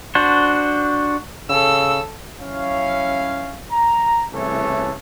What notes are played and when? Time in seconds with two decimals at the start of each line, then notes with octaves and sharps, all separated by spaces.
0.15 D4 F#4 C5
1.50 C#3 A4 E6
2.41 F#2 C#4 E4 C#5 F5
3.72 A#5
4.33 C2 C#3 E3 A3 A4 C#5